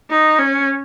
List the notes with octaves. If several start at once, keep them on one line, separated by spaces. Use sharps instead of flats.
D#4
C#4